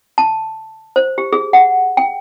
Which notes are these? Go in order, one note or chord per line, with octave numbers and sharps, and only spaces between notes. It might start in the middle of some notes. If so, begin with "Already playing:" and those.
A5
C5
G4
G#4
F#5
G5